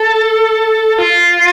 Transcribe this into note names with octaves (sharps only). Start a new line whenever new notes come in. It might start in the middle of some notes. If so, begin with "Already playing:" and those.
Already playing: A4
F4